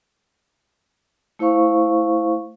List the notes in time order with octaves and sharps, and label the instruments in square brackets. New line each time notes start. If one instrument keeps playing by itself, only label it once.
[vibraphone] A3 E4 C5 F5 C#6